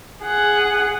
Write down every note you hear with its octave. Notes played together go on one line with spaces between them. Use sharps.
G#4 F#5